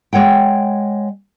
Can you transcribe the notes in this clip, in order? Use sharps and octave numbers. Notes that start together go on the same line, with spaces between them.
G#3 C#5 F#5 G5